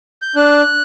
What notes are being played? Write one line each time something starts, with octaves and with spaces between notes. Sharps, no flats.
G6
D4 F#6